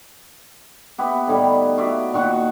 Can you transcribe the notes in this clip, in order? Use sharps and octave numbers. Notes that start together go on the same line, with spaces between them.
B3 G4 E5
A2 D#3 G3
F#4 D5 E5 F5
A#2 D#3 F#4 F#5